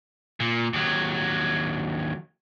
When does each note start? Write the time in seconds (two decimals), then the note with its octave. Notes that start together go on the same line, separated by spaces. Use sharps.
0.40 A#2
0.73 D#2 F#3